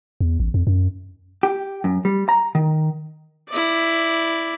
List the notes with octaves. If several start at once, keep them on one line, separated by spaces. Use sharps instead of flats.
E2
A1
F2
F#2
G4
F#2
G3
A#5
D#3
E4 D5